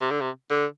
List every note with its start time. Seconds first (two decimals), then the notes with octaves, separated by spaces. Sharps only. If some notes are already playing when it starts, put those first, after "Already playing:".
0.01 C3
0.11 D3
0.21 C3
0.50 D3